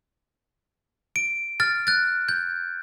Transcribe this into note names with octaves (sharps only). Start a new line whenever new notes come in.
D7
F6 A6
F#6 A6
G6